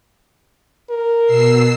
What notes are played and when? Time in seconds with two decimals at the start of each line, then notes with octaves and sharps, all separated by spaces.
0.90 A#4
1.26 B2 E6 C7